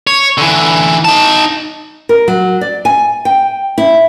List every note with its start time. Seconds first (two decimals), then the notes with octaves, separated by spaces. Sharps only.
0.07 C#5
0.38 D3 E3
1.05 D#4 A5
2.09 A#4
2.28 F#3
2.61 D5
2.85 G#5
3.25 G5
3.78 E4